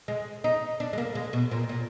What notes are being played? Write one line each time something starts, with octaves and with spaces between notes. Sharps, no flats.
G#3
D#4
D4
G#3
A#3
G#3
B2
A#2
A#2